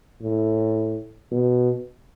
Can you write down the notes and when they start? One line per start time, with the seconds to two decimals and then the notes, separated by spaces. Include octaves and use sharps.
0.22 A2
1.32 B2